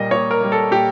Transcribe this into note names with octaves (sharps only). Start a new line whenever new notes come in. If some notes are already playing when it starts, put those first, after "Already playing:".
Already playing: A#2 G3 A#3 D#5
A#2 C#5
A#4
G3 A#3
A4
A#2 G4